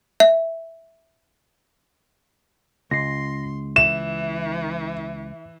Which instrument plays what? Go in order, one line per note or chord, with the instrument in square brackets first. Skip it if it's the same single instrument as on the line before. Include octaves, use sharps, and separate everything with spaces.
[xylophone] E5
[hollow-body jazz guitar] C#2 [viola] C6 [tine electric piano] A#6 C7
[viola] E3 [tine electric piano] E5 [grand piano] E7